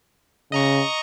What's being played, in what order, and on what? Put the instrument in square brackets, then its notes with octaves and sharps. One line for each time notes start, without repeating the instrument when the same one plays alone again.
[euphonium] C#3 [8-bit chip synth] D#5 A#5 C#6